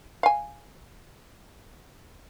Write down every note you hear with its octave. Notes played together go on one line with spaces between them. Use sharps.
F5 G#5